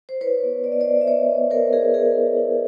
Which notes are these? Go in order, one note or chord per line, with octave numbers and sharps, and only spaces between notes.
C5
E4 B4 C#5
B3
B3 D5
D#5
C5 D5
B3
E5
B3 C#5 D#5
B3
B3 A#4 C5
E4 G#4 A#4
B3 G#4 A#4
E4
E4